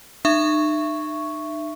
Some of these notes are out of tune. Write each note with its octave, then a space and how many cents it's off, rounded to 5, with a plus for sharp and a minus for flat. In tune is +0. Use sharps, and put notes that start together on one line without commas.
D#4 -40 E5 +20 C#6 +0